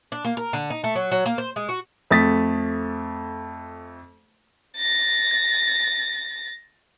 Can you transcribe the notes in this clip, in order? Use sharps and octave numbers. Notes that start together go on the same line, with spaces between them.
D4
A#3
A#4
D3
D#4
A3
F#3
F#3
A#3
C5
G#3
F#4
F2 A3 D#6 A6 B6
A6 A#6